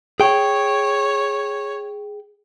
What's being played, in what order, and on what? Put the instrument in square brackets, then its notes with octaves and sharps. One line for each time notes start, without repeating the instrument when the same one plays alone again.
[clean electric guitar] G#4 G5 [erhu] C#5